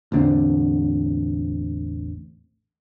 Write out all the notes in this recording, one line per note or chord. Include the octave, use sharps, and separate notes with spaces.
A1 E2 D3 C4